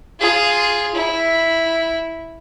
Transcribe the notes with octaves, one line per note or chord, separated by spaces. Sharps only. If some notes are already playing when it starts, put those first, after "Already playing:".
F4 G#4
E4